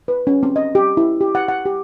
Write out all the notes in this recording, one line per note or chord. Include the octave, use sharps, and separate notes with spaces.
B4
C#4
C4
D#5
G4
E4
G4
F#5
F#5
G4